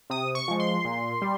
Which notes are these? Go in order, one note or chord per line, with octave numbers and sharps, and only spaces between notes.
C3 D#6
C#6
F3 G#3
C6
A#2
G3